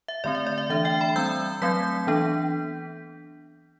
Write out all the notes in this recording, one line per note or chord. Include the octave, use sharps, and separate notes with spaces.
E5
D3 A3 C4 D5
E5
D5
E5
E3 A3 D4 E5
E5 G5
G5 B5
G3 C4 E6 G6
F#3 A3 C4 G6 B6
E3 B3 D4